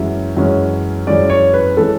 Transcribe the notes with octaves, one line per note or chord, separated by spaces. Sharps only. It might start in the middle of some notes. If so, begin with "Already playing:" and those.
Already playing: F#2 E3 G#3 C#4 E5
F#2 E3 G#3 C#4
F#2 E3 G#3 C#4 D5
C#5
B4
E3 G#3 C#4 A4